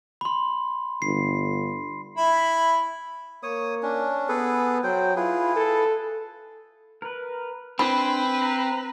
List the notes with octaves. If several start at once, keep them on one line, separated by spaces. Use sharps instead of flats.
B5 C6
G1 C7
E4 B5
A#3 C#5 D#6
C#4 D4
B3 G#4 A4 B4
F#3 C5 G5
E4 F4 G#4 B4
A4
A#4 B4
C4 D4 B4 G#5 B5 C6
A#5